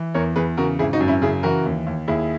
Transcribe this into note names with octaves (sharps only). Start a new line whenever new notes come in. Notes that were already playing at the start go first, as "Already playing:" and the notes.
Already playing: E3
E2 A#4 C#5
E2 G#4 B4
C#3 F#4 A#4
G#1 E4 G#4
D#4 F#4
F#2
C#4 E4
C#3 E4 G#4
E3 F#4 A#4
D#2
D#2
D#2 E4 G#4